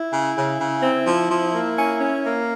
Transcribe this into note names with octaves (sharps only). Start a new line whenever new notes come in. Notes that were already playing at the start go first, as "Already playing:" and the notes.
Already playing: E4
C#3
C#3
C#3
C4
F3
F3
A#3
C#4
C#4
A#3